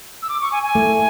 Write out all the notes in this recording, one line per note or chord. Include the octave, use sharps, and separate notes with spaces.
E6
D6
C#6
G#5
G#5
A3